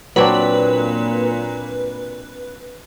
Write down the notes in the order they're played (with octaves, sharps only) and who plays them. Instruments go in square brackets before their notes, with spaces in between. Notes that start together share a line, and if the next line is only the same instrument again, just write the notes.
[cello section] A#2 [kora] F#3 C4 D4 [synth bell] B4